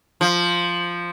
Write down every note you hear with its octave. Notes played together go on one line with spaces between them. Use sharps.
F3